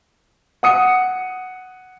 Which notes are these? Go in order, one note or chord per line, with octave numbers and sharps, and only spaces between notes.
F#5 D#6 C#7